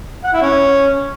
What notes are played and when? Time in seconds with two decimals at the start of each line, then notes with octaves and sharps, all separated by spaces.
0.24 F#5
0.33 E4
0.41 C#4